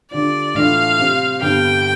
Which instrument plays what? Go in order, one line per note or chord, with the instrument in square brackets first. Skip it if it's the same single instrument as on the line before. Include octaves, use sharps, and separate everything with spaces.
[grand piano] D3 G3 D4 F4 [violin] D5
[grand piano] A2 E3 A3 D4 F4 [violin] F5
[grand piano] C3 G3 C4
[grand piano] G2 D3 G3 B3 [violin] G5